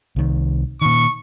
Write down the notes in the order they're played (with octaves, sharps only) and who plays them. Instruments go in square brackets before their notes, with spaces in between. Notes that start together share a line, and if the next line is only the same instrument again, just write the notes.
[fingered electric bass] C2 D#3
[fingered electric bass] A#2 D#3 [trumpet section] C#6